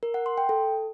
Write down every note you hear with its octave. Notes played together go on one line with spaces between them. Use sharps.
A#4
F#5
C6
G5
A4